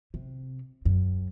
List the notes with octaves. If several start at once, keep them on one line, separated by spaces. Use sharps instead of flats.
C3
F#2